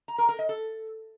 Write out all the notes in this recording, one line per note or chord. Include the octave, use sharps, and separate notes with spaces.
A#5
A#4
A#4
D#5
A4